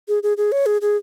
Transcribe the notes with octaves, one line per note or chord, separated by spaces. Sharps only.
G#4
G#4
G#4
C#5
G#4
G#4